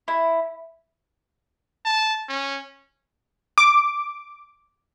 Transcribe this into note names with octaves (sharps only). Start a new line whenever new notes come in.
E4
A5
C#4
D6